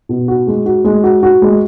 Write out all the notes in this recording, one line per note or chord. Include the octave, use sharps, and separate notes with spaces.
B2
F#4
G#3
F#4
G#3
F#4
F#4
G#3